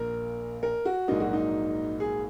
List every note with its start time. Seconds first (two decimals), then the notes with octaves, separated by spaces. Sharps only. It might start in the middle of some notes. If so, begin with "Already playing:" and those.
Already playing: A#1 A#2 A#3 A#4
0.63 A#4
0.85 F#4
1.08 A#1 G#2 F#3 A#3 D#4
1.20 F#4
1.33 D#4
2.00 G#4